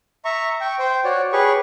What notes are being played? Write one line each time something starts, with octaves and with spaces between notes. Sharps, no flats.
E5 A#5 C#6
G5 C#6
C5 G5
F#4 C#5 D5
G4 G#4 B4 C#5 C#6